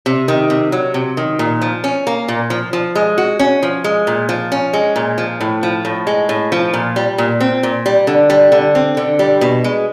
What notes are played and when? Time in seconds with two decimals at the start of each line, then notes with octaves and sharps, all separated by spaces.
0.06 C3
0.28 D#3
0.50 C3
0.72 F#3
0.94 C3
1.17 D#3
1.39 A#2
1.61 F3
1.84 C#4
2.07 A#3
2.28 A#2
2.50 F3
2.73 F3
2.95 G#3
3.18 F#4
3.39 C#4
3.63 F3
3.84 G#3
4.07 A#2
4.29 F3
4.52 C#4
4.73 G#3
4.96 A#2
5.18 F3
5.41 A2
5.63 F3
5.85 A2
6.07 G#3
6.29 A2
6.52 F3
6.74 A#2
6.96 G3
7.18 A#2
7.40 C4
7.63 A#2
7.86 G3
8.07 D3
8.30 G3
8.52 D3
8.75 C4
8.97 D3
9.19 G3
9.41 B2
9.64 G#3